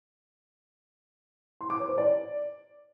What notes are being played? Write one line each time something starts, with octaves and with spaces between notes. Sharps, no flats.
C6
D6
C#5
C5
D5